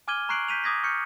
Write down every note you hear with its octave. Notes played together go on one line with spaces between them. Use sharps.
G#5 D6 F6 G#6 D#7 G7
A#5 C#6 F#6 C7 D7 F#7
G6 B6 D#7 F7
D6 D#6 G#6 A#6 B6
C#6 F6 G6 C#7